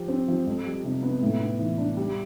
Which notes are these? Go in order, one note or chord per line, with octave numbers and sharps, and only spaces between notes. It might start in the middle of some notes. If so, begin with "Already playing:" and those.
Already playing: F3 G4
C4
F3
F2
G3
C3
B3
A2
B3
E3
D4
G3